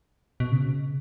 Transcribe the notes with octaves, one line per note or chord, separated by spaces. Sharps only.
B2
C#3